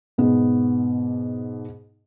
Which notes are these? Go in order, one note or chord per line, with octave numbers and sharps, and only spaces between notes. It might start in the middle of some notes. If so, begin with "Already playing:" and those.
G#2 B2 B3